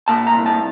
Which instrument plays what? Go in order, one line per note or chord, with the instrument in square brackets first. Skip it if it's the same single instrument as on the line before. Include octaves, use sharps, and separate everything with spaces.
[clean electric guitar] A#2 A5
A#5
C2
A5